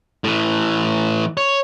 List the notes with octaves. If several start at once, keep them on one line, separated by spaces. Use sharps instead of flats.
A2 E3
C#5